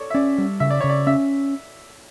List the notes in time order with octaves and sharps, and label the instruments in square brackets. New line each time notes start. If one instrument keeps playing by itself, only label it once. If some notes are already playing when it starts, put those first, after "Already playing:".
Already playing: [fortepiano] A4 C#5 D5
E5
[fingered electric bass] C#4 [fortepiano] D5
[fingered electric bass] G3
[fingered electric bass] C#3 [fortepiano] E5
[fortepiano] D5
[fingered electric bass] C#3 [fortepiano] C#5
[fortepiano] D5
[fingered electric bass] C#4 [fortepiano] E5